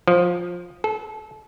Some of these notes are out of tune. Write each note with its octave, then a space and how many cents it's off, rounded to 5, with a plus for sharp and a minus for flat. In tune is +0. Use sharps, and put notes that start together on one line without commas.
F3 +10
A4 -30